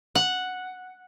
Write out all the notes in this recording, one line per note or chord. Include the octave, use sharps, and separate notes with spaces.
F#5